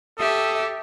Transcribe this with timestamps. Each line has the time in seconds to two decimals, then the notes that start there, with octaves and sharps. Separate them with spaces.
0.19 G4 A4 E5 D#6